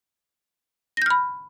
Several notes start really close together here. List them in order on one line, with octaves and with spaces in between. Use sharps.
A#6 G6 F6 B5